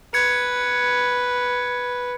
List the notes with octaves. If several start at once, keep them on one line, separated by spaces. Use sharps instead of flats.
B4 G#6 C#7